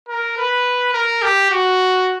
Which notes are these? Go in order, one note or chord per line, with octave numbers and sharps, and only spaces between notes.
A#4
B4
A#4
G4
F#4